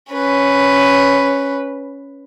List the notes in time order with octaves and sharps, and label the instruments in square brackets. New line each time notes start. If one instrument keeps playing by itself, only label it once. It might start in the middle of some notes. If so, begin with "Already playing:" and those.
[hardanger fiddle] C#4 B4